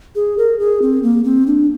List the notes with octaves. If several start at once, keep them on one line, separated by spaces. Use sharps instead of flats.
G#4
A#4
G#4
C4
A#3
C4
D4